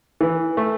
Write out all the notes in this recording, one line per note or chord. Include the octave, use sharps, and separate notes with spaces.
E3
A3